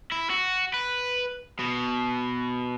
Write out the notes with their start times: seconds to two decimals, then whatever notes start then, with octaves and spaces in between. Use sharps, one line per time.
0.12 E4
0.30 F#4
0.74 B4
1.59 B2